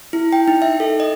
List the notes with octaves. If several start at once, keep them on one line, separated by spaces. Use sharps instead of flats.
E4
G5
D#4
E5
A4
D#5